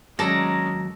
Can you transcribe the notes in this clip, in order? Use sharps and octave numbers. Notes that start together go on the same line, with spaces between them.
D#2 F#3 G#3 C#4 A4 D5 A#5